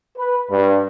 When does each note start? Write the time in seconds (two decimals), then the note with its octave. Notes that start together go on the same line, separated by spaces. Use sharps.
0.17 B4
0.50 G2